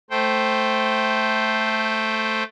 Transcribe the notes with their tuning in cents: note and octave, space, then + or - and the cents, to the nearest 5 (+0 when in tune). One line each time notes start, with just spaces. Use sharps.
A3 +0 C5 +0 G5 -15